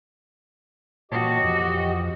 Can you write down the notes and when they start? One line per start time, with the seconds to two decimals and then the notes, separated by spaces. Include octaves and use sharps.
1.12 A#2 E3 F#4 G4 C#5 D#5 A5
1.43 F2